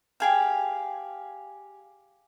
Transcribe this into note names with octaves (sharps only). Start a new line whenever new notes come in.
G4 G#4 F5